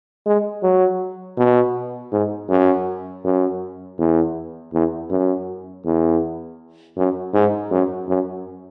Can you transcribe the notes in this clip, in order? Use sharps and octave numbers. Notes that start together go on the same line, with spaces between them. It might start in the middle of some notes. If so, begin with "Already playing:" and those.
G#3
F#3
B2
G#2
F#2
F#2
E2
E2
F#2
E2
F#2
G#2
F#2
F#2